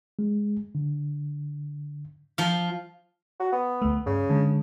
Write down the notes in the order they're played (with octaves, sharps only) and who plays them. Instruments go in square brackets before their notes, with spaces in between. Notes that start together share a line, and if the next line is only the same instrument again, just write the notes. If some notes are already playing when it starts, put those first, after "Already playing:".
[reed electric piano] G#3
D3
[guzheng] F3 F5
[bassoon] F#4
B3
[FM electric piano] D2 A3
[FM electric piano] G2 [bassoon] C#3
[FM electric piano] D3 G#3